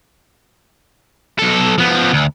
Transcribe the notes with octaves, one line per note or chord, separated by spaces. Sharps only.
B1 A4
F3 B3
D2